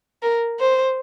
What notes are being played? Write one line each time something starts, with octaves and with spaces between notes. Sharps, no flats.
A#4
C5